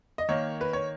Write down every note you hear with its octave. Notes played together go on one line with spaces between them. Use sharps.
D#5
D#3 A#3 C#5
B4
C#5